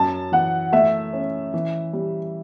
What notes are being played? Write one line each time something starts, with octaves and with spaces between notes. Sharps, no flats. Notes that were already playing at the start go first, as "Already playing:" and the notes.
Already playing: F#2 A5
E3 F#5
A3 E5
C#4
E3
G3